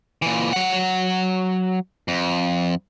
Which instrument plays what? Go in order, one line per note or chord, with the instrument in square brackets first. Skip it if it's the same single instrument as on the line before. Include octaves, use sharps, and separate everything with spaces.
[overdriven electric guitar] A#2 E3
F#3 F#5
F2